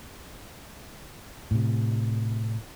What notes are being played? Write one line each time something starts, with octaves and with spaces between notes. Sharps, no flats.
A2 C3